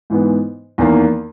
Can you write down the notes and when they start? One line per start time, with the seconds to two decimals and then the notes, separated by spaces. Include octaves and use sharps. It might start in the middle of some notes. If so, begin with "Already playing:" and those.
0.10 G#2 E3 B3
0.78 E2 D#3 A#3